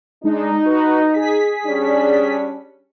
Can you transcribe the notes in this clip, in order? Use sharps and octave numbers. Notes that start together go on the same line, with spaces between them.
G#3 D4 D#4
F#4 B4
G#4 B6
G3 C#4 D4